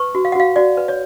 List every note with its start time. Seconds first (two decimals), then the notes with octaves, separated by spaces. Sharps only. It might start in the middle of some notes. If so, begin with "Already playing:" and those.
Already playing: B4 C#6
0.15 F#4
0.25 F5
0.32 F#5
0.35 F#4 F5
0.56 F#4 D5
0.77 B4
0.88 C#5